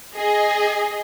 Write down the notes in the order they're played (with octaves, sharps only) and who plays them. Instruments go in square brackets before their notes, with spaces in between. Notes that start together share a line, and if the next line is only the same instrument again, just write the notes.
[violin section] G#4 D#5